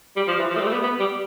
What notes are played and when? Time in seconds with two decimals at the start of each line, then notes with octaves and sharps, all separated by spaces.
0.16 G3
0.28 F3
0.39 E3
0.50 F3
0.56 A3
0.60 G3
0.67 A3
0.72 B3
0.83 B3
1.00 G3